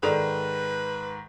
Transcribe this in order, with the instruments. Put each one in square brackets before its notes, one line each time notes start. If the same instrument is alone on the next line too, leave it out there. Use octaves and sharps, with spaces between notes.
[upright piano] G#2 D#3 [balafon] G#4 A4 D5 [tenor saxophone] B4